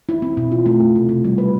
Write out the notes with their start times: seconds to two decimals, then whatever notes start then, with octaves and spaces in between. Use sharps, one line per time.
0.09 E4
0.22 C4
0.37 B2
0.52 F4
0.66 A3
0.80 C4
0.96 C3
1.09 C3
1.25 G3
1.38 B4